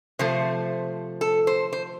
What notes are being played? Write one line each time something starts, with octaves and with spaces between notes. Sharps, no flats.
C3 F3 A3 C5
A4
C5
C5